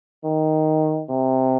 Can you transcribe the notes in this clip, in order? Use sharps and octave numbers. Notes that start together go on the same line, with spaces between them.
D#3
C3